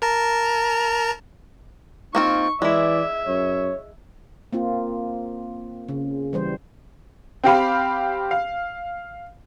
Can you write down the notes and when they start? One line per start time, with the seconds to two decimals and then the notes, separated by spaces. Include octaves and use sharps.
0.02 A#4 A5 A#5
2.15 A#3 C4 D#4 F4 C#6
2.62 E3 G#3 E4 D5 E5
3.27 F#2 C#5
4.53 A#3 C4 F4
5.88 C#3
6.33 E3 G3 C5
7.44 C4 G4 F5 B5
8.31 F5